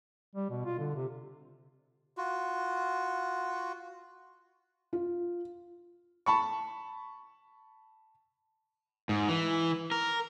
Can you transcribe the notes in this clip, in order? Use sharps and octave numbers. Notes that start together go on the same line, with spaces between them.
G3
B2
F4
D3
C3
F4 F#4
F4
A5 B5 C#6
G#2
E3
A#4